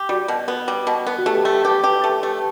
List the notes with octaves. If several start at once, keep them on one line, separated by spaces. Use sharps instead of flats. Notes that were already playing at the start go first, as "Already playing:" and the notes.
Already playing: G4
G3 F#4
B2
B3
G3
B2
B3
F#4
A3 G4
A3 G4
G4 B4
G4
A3
A3